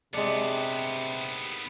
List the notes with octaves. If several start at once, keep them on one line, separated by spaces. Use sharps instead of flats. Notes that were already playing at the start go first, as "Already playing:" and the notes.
D#2 C3 G#3 B3 D4